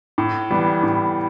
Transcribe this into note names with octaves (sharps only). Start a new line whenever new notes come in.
A2
E3 G3 B3
A2